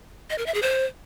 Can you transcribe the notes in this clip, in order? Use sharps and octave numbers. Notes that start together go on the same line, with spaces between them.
D#5
A#4
E5
G#4
C5